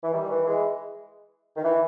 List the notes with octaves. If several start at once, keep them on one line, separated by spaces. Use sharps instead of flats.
E3
D#3 G3
E3
E3 G#3
D#3
E3